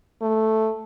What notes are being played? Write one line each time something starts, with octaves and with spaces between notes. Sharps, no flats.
A3